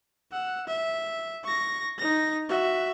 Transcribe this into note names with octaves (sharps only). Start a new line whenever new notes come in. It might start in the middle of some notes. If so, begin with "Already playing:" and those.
F#5 E6
E5
C#6 A#6
D#4 A#6
F#4 E5